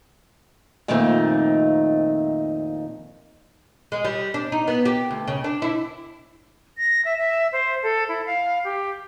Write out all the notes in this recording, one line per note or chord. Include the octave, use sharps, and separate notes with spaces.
F2 A#2 D#3 A3 C4 D#4
G#3
G3
D4
D#4
B3
G4
D2
C#3
D4
E4
A#6
E5
E5
C5
A4
E4
F5
G4